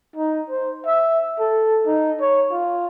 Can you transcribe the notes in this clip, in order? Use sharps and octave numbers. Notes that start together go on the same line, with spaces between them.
D#4
C5
E5
A4
D#4
C#5
F4